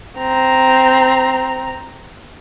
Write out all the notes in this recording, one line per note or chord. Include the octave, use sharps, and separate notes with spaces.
C4 A#5